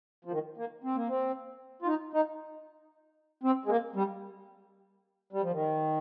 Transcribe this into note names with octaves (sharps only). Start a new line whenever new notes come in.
F3
D#3
A#3
C4
A#3
C4
F4
D#4
D#4
C4
G#3
A#3
G3
G3
F3
D#3